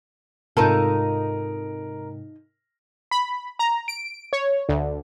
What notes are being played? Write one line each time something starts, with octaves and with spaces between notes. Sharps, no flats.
G#2 C3 D#4 F4 A4 A#4
B5
A#5
D7
C#5
D2